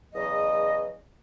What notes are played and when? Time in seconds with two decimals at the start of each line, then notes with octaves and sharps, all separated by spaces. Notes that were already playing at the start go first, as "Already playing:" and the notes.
0.14 E2 C#3 F#3 D#5